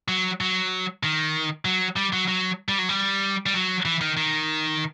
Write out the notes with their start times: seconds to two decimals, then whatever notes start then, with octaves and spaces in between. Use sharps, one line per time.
0.08 F#3
0.41 F#3
1.03 D#3
1.65 F#3
1.96 G3
2.13 F#3
2.28 F#3
2.69 G3
2.78 F#3
2.89 G3
3.46 G3
3.54 F#3
3.85 E3
4.01 D#3
4.17 D#3